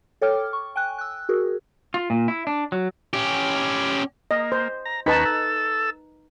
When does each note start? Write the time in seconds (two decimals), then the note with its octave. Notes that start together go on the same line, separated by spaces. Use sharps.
0.22 A4 C#5 G5 D6 F6
0.53 C#6
0.76 G5 G#5 F#6
0.98 E6 F#6
1.29 F#4 G#4 A#4
1.94 F4
2.10 A#2
2.28 E4
2.47 D4
2.72 F#3
3.13 C#4 G4
4.31 A#3 D#5
4.52 C5
4.86 A#5
5.06 D#2 C#4 D#4 B4 A5 B5
5.25 A4 E6